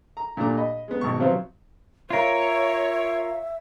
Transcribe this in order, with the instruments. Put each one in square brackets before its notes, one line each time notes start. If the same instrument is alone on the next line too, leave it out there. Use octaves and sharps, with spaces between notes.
[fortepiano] A#5
A#2 A3 D4 G4 A#5
D#5 B5
G#3 B3
G#1 B2 C#6
C3 F3 F#3 C4 F4 B4
[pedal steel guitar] F4 A#4 [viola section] C#5 [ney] E5